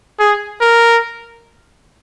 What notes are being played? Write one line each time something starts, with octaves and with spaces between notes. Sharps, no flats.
G#4
A#4